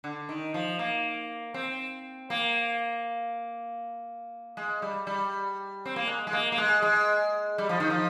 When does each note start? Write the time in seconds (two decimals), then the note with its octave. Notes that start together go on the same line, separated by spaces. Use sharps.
0.04 D3
0.29 D#3
0.54 F3
0.79 A#3
1.54 C4
2.30 A#3
4.57 G#3
4.82 G3
5.07 G3
5.86 C4
5.96 A#3
6.07 G#3
6.27 G#3
6.33 A#3
6.52 A#3
6.58 G#3
6.82 G#3
7.58 G3
7.69 F3
7.80 D#3
7.90 F3